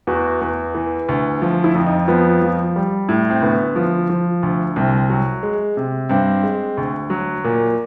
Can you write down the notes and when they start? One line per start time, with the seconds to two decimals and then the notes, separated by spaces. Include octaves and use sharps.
0.07 E2 F#4
0.41 E2
0.75 E3
1.09 D2
1.42 F3
1.64 E4
1.75 F2
1.87 D#4
2.08 F3 B3
2.42 F3
2.76 G3
3.09 A2
3.30 C4
3.42 D2 B3
3.76 F3
4.10 F3
4.43 D2
4.76 C2 C4
5.10 F#3
5.43 G#3
5.77 C3
6.09 G2 C4
6.43 G#3
6.77 D2
7.10 F#3
7.44 A#2